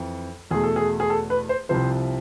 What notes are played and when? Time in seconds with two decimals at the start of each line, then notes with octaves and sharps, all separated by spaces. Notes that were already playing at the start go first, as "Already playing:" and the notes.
Already playing: F2 E3
0.51 E2 B2 A3 G#4
0.64 A4
0.76 G#4
1.00 G#4
1.10 A4
1.30 B4
1.49 C5
1.69 C2 C3 F3 C5